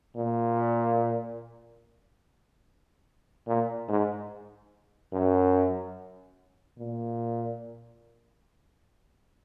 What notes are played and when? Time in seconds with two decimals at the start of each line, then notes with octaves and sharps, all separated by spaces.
0.16 A#2
3.47 A#2
3.89 G#2
5.13 F#2
6.78 A#2